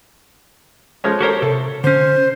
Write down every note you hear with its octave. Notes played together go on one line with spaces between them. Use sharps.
F3 G#3 C#4
F#4 G4 A4 A#4 C5 C#5
C3 A4
D3 C#4 C5